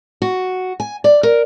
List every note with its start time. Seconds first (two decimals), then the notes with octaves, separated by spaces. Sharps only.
0.22 F#4
0.80 G#5
1.04 D5
1.23 A#4